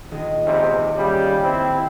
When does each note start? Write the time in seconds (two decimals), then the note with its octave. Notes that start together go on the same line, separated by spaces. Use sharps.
0.11 D#1 D#5
0.46 E2 G#2 C3
0.97 C#3 G3
1.43 C4 E4